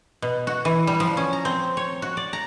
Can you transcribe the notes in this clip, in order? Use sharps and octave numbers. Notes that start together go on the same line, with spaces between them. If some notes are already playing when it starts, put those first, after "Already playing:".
B2
F#4
E3
G3
F3
C#4
A#5
C4
C#5
F#4
D5
A#5